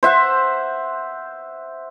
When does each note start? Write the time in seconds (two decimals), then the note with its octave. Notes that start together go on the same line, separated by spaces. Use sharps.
0.03 C5 E5 F#5